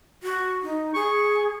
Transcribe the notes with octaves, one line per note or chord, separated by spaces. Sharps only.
F#4
D#4
G#4 C#6